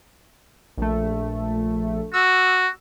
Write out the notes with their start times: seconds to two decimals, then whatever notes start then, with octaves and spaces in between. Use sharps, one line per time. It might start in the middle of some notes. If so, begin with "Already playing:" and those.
0.77 A#1 A3
2.14 F#4 E6